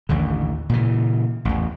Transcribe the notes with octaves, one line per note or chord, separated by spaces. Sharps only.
A1 D#2 D3
A#2 C#3 E3
A1 E2